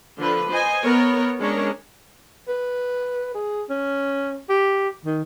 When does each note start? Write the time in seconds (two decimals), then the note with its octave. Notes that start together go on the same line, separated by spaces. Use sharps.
0.19 D3 F3 B4
0.51 C5 D#5 G#5
0.83 B3 A#4 C#5
1.39 G#3 C#4 D4 A#4 C#5
2.48 B4
3.35 G#4
3.69 C#4
4.49 G4
5.05 D#3